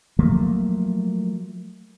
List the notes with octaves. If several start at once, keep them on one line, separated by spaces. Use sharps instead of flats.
F3 F#3 A3 A#3